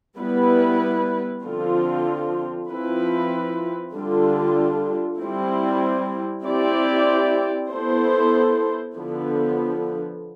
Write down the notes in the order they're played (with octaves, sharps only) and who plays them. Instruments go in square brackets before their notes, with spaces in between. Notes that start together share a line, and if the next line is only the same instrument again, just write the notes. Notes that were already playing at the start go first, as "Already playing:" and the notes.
[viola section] G3 B3 E4 B4
D3 F3 C4 F4
F3 C4 E4 B4
D3 G3 D4 F4
G3 C4 E4
C4 E4 G4 D5
B3 E4 A4 C5
D3 F3 B3